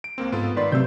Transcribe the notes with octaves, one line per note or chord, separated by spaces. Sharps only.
D7
C#2 A#3 C4
G#2 B3 F4 A4
D#3 B4 D5 C6
C3 F#3 A3 C4 E6 G6